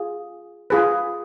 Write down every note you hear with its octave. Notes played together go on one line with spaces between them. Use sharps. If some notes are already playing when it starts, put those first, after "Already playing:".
Already playing: F4 G#4
F4 G#4 B4